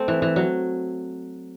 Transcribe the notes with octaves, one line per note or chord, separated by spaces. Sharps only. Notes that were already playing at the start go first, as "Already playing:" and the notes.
Already playing: A3 C4
E3
E3
F#3